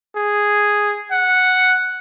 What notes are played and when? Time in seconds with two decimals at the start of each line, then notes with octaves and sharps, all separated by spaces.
0.16 G#4
1.11 F#5